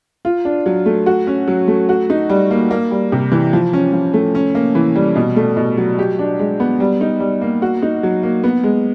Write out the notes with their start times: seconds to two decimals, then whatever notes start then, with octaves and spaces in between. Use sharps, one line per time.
0.25 F4
0.45 D4
0.66 F#3
0.86 A3
1.06 F#4
1.27 C#4
1.47 F#3
1.68 A3
1.89 F#4
2.10 D#4
2.30 G3
2.51 A#3
2.71 A#3
2.91 G3
3.12 C3
3.32 E3
3.53 F3
3.73 C#4
3.93 F3
4.14 A3
4.35 C#4
4.55 A#3
4.75 E3
4.95 G3
5.16 B2
5.36 A3
5.57 B2
5.77 F#3
5.99 G4
6.19 D4
6.39 G#3
6.60 B3
6.80 G3
7.01 D#4
7.20 G3
7.41 A#3
7.62 F#4
7.82 D#4
8.03 F#3
8.23 A#3
8.43 B3
8.64 G#3